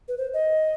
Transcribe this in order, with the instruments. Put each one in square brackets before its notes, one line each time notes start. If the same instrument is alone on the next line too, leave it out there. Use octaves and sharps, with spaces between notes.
[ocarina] B4
C5
D#5